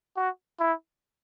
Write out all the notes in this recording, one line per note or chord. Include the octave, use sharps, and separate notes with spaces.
F#4
E4